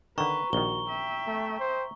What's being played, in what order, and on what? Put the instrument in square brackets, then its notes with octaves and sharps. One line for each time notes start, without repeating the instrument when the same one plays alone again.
[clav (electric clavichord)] D3 D#3 [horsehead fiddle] B4 [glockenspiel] A#5 C#6
[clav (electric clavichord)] A#1 D#3 [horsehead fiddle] F#4 [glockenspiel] G7
[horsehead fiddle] E5 G5
[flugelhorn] A3
C5